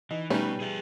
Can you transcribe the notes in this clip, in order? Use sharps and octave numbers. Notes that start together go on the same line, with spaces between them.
E3 D#4
B2 G3 A3 C#4 D#4 B4 C#5
G#4 E5